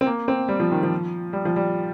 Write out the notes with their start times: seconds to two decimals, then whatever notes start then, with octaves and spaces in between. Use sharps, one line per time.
0.01 C4
0.06 A#3
0.28 C4
0.48 G3
0.60 F3
0.72 D#3
0.83 F3
1.33 G3
1.45 F3
1.56 G3